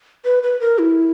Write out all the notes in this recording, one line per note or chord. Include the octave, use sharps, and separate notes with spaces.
B4
B4
A#4
E4